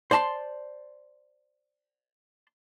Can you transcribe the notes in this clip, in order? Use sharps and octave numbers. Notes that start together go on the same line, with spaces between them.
C5 D5 A5 A#5 C6